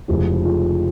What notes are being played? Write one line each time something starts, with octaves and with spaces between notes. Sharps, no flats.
F1 F2 C#3 F3 G#3 E4 G4
F4 G#4